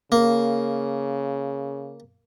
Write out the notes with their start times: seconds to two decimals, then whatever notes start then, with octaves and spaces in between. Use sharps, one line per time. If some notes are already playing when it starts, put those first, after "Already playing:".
0.12 C#3 A#3